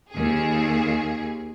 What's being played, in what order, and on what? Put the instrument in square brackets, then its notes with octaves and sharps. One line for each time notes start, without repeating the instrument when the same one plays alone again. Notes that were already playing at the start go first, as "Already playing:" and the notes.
[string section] D#2 G#4